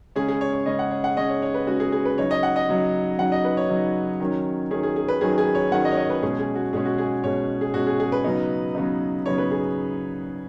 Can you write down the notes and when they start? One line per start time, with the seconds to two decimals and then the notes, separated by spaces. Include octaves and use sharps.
0.16 C#3 G#3 C#4 G#4
0.28 G#4
0.41 C#5
0.53 C#5
0.66 C#3 G#3 C#4 D#5
0.79 F#5
0.91 C#5
1.04 F#5
1.17 C#3 G#3 C#4 D#5
1.29 C#5
1.42 C#5
1.54 B4
1.67 C#3 G#3 C#4 F#4
1.80 G#4
1.92 G#4
2.05 B4
2.18 C#3 F#3 D#4 C#5
2.31 D#5
2.43 F#5
2.56 D#5
2.68 C#3 F#3 D#4
3.19 C#3 F#3 D#4 F#5
3.32 D#5
3.45 B4
3.57 C#5
3.69 C#3 F#3 D#4
4.20 D#3 F#3 C#4
4.71 D#3 F#3 C#4 G#4
4.83 G#4
4.96 G#4
5.08 B4
5.21 D#3 F#3 C#4 G#4
5.38 G#4
5.55 C#5
5.72 D#3 F#3 C#4 F#5
5.85 D#5
5.91 C#5
5.97 D#5
6.10 B4
6.22 B2 G#3 C#4 G#4
6.39 G#4
6.56 F#4
6.73 B2 G#3 C#4 G#4
6.85 F#4
6.98 G#4
7.23 B2 G#3 C#4 C#5
7.61 G#4
7.74 B2 G#3 C#4 F#4
7.87 G#4
8.00 G#4
8.12 B4
8.24 C#3 F#3 B3 D#4
8.75 C#3 F#3 B3 D#4
9.25 C#3 F#3 B3 D#4 C#5
9.38 B4
9.51 G#4